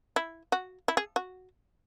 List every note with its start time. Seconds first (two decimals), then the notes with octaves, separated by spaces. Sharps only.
0.16 E4
0.52 F#4
0.88 E4
0.97 G#4
1.16 F#4